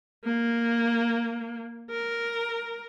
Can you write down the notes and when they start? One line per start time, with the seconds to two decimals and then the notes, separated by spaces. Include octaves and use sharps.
0.24 A#3
1.90 A#4